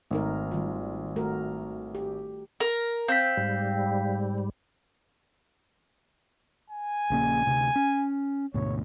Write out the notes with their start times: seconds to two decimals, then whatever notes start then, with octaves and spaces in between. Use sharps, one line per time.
0.11 G#1 A3 D#4 A#4
0.51 D#3 G3 F4
1.16 A3 F#4 A#4
1.95 G4
2.60 A#4
3.08 C4 F5 G6 B6
3.37 G#2 G3
6.70 G#5
7.10 A#1 C#3 A#3
7.46 D2 C3
7.76 C#4
8.54 D2 G#2 B2 C#5